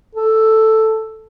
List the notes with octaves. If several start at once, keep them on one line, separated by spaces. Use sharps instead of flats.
A4